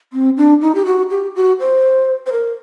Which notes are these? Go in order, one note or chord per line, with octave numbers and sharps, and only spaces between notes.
C4
D4
D#4
G4
F#4
G4
F#4
C5
C5
A#4